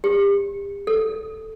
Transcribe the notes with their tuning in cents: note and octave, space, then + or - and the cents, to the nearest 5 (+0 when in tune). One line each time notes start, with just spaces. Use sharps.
G4 +35
A4 +0